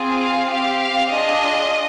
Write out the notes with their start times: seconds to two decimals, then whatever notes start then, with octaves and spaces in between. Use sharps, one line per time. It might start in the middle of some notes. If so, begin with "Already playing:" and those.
Already playing: C4 F4 G#4
0.18 F5
0.48 C4 G4 F5
0.79 F5
1.10 D4 F4 G#4 D#5